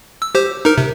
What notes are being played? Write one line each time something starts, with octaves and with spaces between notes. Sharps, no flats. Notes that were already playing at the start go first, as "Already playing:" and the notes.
E6
G4 C5
D#4 A#4
C3